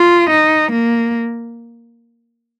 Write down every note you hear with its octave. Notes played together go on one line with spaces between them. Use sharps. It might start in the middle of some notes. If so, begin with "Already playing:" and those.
Already playing: F4
D#4
A#3